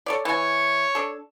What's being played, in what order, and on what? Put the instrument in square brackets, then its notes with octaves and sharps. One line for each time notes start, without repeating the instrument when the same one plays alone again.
[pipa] A4 C#5 D5
[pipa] E3 G#5 [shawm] C#5
[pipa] D4 A4